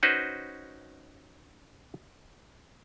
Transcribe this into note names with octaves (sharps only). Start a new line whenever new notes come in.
C#4 D#4 F#4 B4 C5